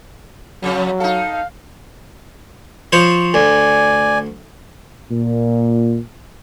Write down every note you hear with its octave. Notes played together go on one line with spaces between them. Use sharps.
F2 C#3 F#3
D#4 A4 F5
F3 C5 C#5
D2 D5 G#5
A#2